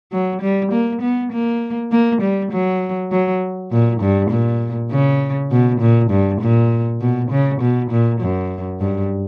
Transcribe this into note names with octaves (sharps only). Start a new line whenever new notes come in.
F#3
G3
A#3
B3
A#3
A#3
G3
F#3
F#3
A#2
G2
A#2
C#3
B2
A#2
G2
A#2
B2
C#3
B2
A#2
F#2
G2